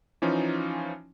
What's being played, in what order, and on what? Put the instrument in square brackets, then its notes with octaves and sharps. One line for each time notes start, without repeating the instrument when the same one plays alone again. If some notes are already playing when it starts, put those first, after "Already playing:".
[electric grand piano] E3 F3 C#4 D#4 F4